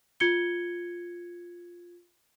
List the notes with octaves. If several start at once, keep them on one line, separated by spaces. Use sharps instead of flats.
F4 G#6 C#7 G7